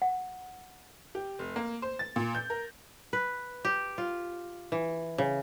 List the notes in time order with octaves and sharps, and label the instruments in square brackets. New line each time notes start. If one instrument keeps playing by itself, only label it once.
[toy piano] F#5
[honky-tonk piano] G4
F1
A#3
C5
A6
A#2
G6
A#4
[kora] B4
G4
F4
E3
C#3